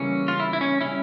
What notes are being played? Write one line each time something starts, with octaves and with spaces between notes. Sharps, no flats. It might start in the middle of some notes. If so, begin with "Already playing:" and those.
Already playing: C#3 E3 G3 A#3 C#4
F4
E4
E4
C#4
G3 C#4 E4